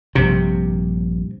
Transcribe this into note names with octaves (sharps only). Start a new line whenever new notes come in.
A#1 G2 C3